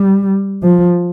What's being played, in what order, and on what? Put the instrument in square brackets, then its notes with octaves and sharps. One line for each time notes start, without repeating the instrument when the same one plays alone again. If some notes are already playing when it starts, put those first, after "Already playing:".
Already playing: [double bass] G3
F3